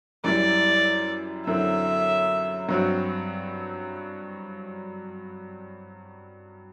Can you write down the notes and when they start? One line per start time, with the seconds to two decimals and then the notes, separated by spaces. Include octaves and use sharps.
0.24 F#2 E3 G3 D5
1.47 F#2 D3 F#3 C4 E4 E5
2.69 G2 F#3 C4 F#4